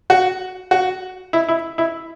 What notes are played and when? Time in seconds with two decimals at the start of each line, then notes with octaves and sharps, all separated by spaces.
0.10 F#4
0.71 F#4
1.33 E4
1.49 E4
1.78 E4